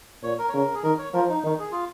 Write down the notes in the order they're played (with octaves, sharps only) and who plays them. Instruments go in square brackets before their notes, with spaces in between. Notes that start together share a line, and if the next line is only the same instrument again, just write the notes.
[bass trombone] A#2 [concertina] C#5
[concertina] A#4
C#5
[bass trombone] C#3 [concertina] A#4
[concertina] G#4
[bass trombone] D#3 [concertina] A#4
[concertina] C#5
[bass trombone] F3 [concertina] A#4
[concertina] D#4
[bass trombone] D#3 [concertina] D#4
[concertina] G#4
F4